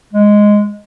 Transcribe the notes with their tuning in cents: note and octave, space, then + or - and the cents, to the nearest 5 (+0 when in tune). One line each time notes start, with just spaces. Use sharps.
G#3 +0